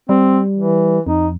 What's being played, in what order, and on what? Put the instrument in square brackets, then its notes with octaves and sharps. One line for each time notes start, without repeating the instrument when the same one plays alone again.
[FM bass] G3 [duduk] C4
[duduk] E3
[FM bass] F2 [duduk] D#4